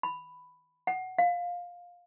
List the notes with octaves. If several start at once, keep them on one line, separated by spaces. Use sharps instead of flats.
B5
F#5
F5